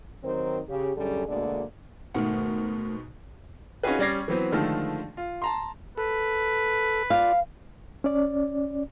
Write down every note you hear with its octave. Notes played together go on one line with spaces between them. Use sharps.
D#3 F#3 C4 D#4 A#4 C5
C#3 G4
F#2 D3 G3 C#4 G#4 A4
D2 B2 D3 G#3 A#3 D5
G#2 B2 D#3 A3 A#4 F#5
C#4 D#4 F4 F#4 G#4 B4
G3 C#4 D5 G#6 A#6 C7
E3 F#3 B3 C4
D3 D#3 F3 G#3 A3
F4
A5 A#5 C6
A4 B4
F4 D5 F5
C#4 D5